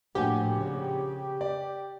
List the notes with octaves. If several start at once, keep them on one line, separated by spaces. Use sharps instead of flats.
A#1 A2 F#4 G4 G#5
C#3
D5